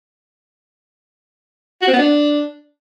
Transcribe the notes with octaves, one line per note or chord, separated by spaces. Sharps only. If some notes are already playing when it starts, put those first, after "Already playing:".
F#4
C4
B3
D4